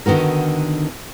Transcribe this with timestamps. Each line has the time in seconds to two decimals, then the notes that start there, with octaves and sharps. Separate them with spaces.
0.06 D3 D#3 B3 F#4 A#4